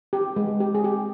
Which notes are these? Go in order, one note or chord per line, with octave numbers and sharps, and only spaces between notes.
G4
G#3
G4
G#4
G4